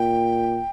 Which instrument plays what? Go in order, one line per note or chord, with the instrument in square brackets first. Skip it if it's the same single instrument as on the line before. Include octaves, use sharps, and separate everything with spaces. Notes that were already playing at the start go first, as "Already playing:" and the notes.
Already playing: [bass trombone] A#2 [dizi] G5